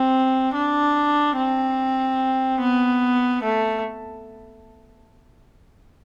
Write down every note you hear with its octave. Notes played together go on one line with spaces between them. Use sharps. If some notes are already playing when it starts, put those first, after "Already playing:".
Already playing: C4
D4
C4
B3
A3